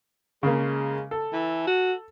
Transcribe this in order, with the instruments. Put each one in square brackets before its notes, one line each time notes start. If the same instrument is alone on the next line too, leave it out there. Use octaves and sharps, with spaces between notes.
[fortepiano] C#3 A#3 [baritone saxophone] G#3
[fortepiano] A4
[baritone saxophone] E3
F#4